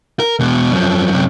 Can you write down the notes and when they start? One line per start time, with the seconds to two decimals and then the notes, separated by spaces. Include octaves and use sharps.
0.20 A#4
0.40 E2 B2
0.72 F#2 F3
1.09 F#2 C3